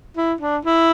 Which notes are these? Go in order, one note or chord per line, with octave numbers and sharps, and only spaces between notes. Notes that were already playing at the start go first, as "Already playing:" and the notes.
E4
D4
E4